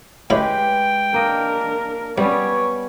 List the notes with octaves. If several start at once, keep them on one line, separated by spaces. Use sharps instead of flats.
D2 C#3 G#3 E4 G4 B4 G5
A#3 D4 A#4 D#5
C2 G3 B3 C#4 C#5 D5